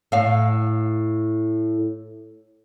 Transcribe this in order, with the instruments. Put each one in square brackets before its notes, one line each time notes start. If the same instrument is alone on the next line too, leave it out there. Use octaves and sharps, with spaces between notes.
[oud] A2 F5